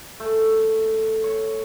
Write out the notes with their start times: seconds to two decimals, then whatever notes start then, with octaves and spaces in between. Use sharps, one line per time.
0.20 A3
1.24 C#5